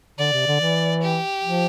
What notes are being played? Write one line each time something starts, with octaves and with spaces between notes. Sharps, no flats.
D3 D5
C3
D3
E3
G4
F3